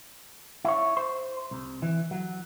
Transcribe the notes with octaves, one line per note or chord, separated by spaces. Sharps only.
E4 C#5
C5
C2
E3
F#3